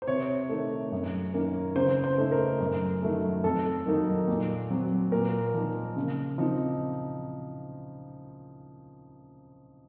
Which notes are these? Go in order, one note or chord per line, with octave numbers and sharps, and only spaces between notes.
C5
C3 C#5
D#3 A3
F#2
D#3 A#3 C#4
C#3 C5
C5
A3 D#4
A#4
F#2
D#3 F#3 A3
F2 A4
D#3 F#3 A#3 D#4
A#2
F#3 C4
A#2 A#4
F3 A#3 D#4
C#3
F3 C4 D#4